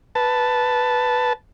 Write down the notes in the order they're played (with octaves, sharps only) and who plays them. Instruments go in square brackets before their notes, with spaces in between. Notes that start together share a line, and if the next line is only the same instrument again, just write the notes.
[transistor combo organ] B4 A5